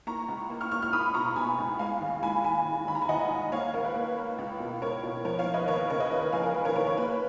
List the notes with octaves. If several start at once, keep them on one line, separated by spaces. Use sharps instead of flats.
A#3 A#5 C#6
C#2
A#3
C#6 F6
A#3 C#6 F6
C#6 F6
A#3 B5 D#6
B2 A#5 C#6
B2 G#5 B5
C#2
G#3 F5 G#5
D#2
G#3 G#5 B5
D#2 G#5 B5
D#2
D#3 B5
A#5
G#5
D#2 D#5 F#5
D#2
A#3 C#5 F5
C#2 A#4 C#5
B4
A#3
A#3
C#2
B2
C#2 A#4 C#5
B2
F3 A#4 C#5
C#5 F5
F3
B4 D#5
D#2 A#4 C#5
C#3 A#4 C#5
B4 D#5
D#2 B4
A#4
F3 F5 G#5
A#4
F3 B4
A#4 C#5
D#2 A#4 C#5
A#4 C#5
A#3 B4